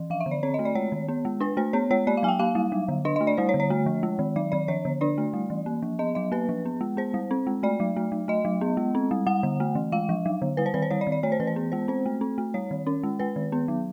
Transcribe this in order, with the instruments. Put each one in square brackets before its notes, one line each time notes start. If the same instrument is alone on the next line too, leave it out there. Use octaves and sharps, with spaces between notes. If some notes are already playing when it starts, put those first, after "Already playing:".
Already playing: [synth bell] E3
F3 F5
E5
D3
D5
C4 C#5
D#5
A3
D5
G#3 C#5
D#3
B3
G#3
D4 B4
A3 C5
B3 C#5
G#3 C#5
A#3 D5
F5
F#3 G#5
G5
A#3 F5
G3
F#3
D3
D4 D#5
D#5
A3
D5
G3 C5
C#5
D3
C#5
A3
F3
G#3
D#3
F#3 D5
D#3 D5
F3 C#5
D3
D4 D5
A3
G3
E3
A#3
F3
B3 D#5
F#3 D#5
A#3 B4
F3
B3
G#3
B3 C5
G3
C4
G#3
A3 D5
F#3
A3
F#3
A3 D#5
F#3
B3
G#3
C4
G3
G3 F#5
D3
A3
E3
G#3 F5
F3
F#3
D3
G3 B4
C5
D#3 B4
C5
G3 C#5
D5
D#3
D5
A3 C#5
C5
E3 B4
C5
B3
G#3 C5
C4 C5
A3
C4
A3
G3 C#5
D#3
C#4
G#3
G#3 B4
D#3
B3
F#3